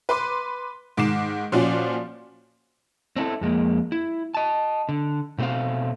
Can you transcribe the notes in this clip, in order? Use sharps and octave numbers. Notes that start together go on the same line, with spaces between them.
B4 C6 D6
G#2 D#3 D6 C7 E7
A#2 F3 C#4 F#4 C5 D5
C4 D4 E4 A4
F2 G#3 A#3
E4
D#5 A5
D3
B2 A3 C4 C5 F5